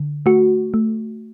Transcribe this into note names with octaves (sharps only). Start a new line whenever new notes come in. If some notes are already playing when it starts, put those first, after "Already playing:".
Already playing: D3
A3 F#4
A3